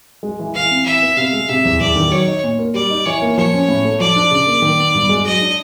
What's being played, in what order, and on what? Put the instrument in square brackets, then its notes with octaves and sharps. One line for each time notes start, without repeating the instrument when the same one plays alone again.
[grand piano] G#3
E3
[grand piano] E3 [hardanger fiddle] F5
[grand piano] C4
[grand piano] E3 [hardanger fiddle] E5
[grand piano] B3
[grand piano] C3 [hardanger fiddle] F5
[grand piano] G#3
[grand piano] C3 [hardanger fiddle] E5
[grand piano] E2
[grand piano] E2 [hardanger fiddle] D5
[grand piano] D#3
[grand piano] F#3 [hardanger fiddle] C#5
[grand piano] D#4
A#2
A#3
[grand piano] G3 [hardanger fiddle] D5
[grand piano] D#4
[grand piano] E3 [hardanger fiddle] C#5
[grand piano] A#3
[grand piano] F3 [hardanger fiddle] C#5
[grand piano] C#4
A2
A3
[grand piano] F3 [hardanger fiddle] D5
[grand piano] D4
C#3
A#3
D#3
B3
G2
G#3
[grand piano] F#3 [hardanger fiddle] D#5
[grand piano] D4